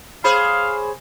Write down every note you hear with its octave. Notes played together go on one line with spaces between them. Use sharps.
G#4 C5 C#5 F5 B5